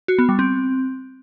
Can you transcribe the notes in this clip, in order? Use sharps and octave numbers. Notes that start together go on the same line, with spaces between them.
F#4
B3
G3
C4